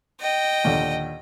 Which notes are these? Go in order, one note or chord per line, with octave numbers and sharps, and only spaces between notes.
D#5 G5
D#2 A#2 D3